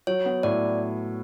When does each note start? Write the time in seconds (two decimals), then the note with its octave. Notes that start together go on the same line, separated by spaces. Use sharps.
0.07 F#3 C#5
0.26 B3
0.43 A2 D5